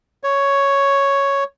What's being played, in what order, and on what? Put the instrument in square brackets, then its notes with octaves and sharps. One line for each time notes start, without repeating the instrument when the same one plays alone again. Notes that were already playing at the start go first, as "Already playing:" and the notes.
[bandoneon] C#5